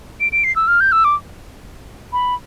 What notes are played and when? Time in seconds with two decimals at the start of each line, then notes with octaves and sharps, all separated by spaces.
0.20 D7
0.32 D7
0.44 C7
0.56 E6
0.68 F6
0.80 G6
0.92 E6
1.05 D6
2.13 B5